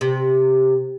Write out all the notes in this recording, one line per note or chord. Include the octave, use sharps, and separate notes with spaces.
C3